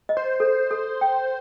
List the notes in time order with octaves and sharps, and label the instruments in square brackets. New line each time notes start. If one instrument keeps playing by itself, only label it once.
[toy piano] D#5
[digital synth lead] C5
[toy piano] A4
A4
G5